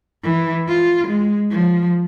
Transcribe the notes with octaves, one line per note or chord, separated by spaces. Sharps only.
E3
F4
G#3
F3